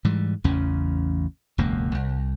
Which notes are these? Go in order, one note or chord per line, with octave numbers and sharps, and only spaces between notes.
G#2 E3 G3
A1 E2 C#3 C#4
E1 C#2 F#2 A#3
C2